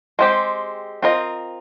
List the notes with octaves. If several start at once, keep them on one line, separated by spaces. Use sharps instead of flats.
G#3 C4 G4
C4 F4 A#4 D#5